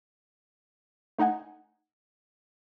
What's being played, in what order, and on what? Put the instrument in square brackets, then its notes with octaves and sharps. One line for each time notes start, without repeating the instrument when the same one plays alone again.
[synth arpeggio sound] A3 D#4 D#5 F#5 G#5